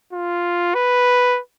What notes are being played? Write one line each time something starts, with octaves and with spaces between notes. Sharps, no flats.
F4
B4